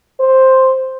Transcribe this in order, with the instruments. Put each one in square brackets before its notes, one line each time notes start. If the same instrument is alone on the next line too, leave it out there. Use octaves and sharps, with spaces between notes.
[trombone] C5